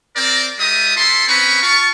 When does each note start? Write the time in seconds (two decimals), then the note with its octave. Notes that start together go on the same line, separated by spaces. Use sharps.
0.16 C4 A#4 D5
0.59 G#3 F4 G4 A#4 E5 D#6
0.95 E4 F4 A4 A5 C6
1.28 C4 C#4 B4 A#5 B5 C#6
1.62 F4 F5 A5 C#6